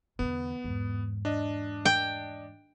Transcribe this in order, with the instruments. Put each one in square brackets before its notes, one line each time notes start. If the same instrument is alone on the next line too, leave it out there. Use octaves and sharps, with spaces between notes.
[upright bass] E2 D3 [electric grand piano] B3
[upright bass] E2 G#2
[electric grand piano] D4 D#5
[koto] G5